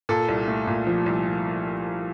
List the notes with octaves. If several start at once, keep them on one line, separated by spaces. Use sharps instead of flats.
A#2 A4
C2
A3
A#2
F3
C2